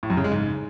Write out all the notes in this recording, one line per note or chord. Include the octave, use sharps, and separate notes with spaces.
A2
F#2
C#3
G#3
G#2